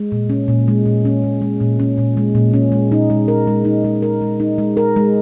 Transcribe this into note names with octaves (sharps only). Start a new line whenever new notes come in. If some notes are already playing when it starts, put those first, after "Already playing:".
Already playing: G#3
A#2
C#4
A#2
G#3
A#2
C#4
A#2
G#3
A#2
C#4
A#2
G#3
A#2
C#4
G#3
D#4
G#3
A#4
G#3
D#4
G#3
A#4
G#3
D#4
G#3
A#4
G#3